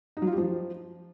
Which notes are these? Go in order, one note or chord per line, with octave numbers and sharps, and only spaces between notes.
D#4
F#3
F4
G4
F3